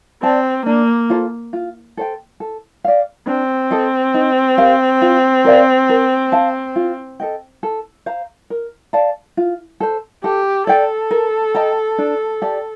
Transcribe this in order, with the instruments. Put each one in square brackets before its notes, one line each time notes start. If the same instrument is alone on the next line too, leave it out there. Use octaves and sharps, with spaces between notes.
[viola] C4 [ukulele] D5 A5
[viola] A#3 [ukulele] D4
[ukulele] F4 A4 C5
F4
A4 C5 G5
A4
D5 F5
[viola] C4 [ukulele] D4
[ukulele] A4 C5 D#5
D#4
G4 A#4 F5
F4
A#4 D5 F5
A#4
F5 A5
F4
A4 D#5 G5
A4
C5 F5 A#5
A#4
D5 F5 A5
F4
A4 C5
[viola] G4 [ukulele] A4
[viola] A4 [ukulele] D5 G5
[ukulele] A#4
D#5 G5 A#5
D4
G4 D5 A5